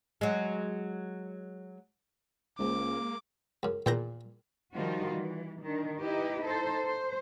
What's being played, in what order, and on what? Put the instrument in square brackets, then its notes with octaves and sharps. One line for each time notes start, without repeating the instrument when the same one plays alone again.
[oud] F#3 G#3
[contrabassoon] C#2 [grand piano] G#3 C5 [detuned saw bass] A#3 [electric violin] D6
[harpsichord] C#2 F#2
[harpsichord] E2 D#3 E4 [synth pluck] A#2 G6 A#6
[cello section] D#3 F3 G3 F4 F#4
E3
D#3 D4
D#4 E4 G4 B4 D#5
D#4 A4 C5
C5